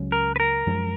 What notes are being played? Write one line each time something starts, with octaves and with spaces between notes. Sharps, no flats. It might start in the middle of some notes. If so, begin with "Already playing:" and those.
Already playing: C#2 C#3 F#3 C#4
A#4
B4
A#4
F#2 F3 G#3